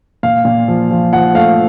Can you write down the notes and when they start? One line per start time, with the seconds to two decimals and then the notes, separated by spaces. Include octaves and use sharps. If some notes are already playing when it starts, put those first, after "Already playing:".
0.23 A#2 F5
0.45 A#2
0.68 F3
0.91 F3
1.13 F3 F#5
1.35 A3 F5